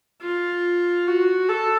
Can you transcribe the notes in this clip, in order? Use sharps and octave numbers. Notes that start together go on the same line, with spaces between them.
F4
F#4
A4